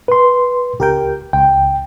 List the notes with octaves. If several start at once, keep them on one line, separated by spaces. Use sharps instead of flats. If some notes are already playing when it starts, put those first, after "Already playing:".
B4 C6
C#2 G4 A#4 G5
C#2 G5